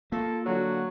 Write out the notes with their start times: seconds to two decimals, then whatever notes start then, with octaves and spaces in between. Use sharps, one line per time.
0.12 A#3 F4 A4
0.46 D3 F#3 F#4